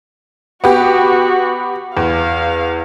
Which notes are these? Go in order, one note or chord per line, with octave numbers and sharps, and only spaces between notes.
B3 F#4 G4
E2 F5